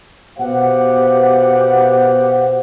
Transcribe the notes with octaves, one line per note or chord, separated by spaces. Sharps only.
B2 B3 G4 C5 F5 F#5